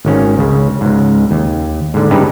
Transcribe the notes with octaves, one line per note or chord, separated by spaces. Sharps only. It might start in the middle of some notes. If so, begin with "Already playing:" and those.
G#1 D#3 C#4
C#2 C#3
C#2 G#2
D#2
G#2 D3
G2 C#3 D#4 G4 B4 A5